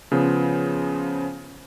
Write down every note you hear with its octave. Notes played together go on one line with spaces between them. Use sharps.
C#3 F3 B3 C5